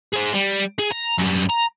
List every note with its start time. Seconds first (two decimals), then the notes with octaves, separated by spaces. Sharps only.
0.13 G#4 C5
0.34 G3
0.78 G#4
0.91 A#5
1.18 F#2 G3
1.49 A#5